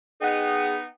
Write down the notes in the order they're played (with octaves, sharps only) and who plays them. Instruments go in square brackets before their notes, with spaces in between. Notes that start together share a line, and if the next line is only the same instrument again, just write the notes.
[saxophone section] B3 D#4 [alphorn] G#4 [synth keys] F#5 G5